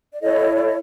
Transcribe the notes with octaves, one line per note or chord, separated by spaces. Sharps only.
D5
E4 A4 C#5 D#5
D5
D#5